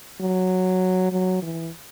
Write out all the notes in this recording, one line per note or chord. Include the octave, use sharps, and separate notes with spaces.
F#3
F#3
E3